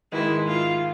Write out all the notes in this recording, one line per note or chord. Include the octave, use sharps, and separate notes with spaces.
G#2 D#3 G#3 E4
F4